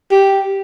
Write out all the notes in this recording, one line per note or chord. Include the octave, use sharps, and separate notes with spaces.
G4